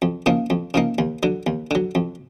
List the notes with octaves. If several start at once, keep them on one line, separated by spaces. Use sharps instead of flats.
F2
C#3 F3 A#3 D#4
F2
C#3 F3 A#3 D#4
D#2
D3 F#3
D#2
D3 F#3
F2